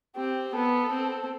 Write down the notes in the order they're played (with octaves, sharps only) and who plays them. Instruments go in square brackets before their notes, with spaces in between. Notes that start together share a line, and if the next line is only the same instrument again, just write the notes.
[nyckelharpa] C4 [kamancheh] G4
[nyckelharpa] B3 [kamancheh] A4
[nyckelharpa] C4